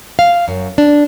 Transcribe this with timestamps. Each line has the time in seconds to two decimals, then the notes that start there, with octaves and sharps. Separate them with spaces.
0.19 F5
0.48 F#2
0.78 D4